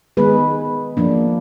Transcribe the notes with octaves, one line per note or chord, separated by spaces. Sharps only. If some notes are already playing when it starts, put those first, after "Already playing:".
D#3 G#3 B3 G#4 B4
F3 A#3 D4